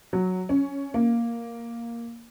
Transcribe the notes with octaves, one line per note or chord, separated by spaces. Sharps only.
F#3
C#4
A#3